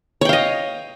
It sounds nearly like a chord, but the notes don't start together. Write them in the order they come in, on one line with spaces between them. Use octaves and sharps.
C#5 G5 F5 D#5